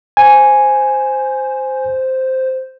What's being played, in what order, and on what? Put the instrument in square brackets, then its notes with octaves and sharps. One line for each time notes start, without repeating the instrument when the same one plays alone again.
[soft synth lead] C5 [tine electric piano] G#5